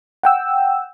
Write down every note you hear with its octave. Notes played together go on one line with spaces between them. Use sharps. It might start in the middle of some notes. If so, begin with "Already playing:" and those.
F#5 G5 E6